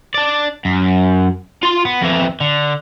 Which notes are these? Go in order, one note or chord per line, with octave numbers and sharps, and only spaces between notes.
D4 D5
F#2
F4 C6
B3
F2 E3
D3